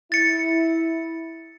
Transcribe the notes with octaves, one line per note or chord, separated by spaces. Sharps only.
E4 A6 C#7